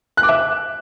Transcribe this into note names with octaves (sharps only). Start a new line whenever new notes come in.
F#6
D6
E5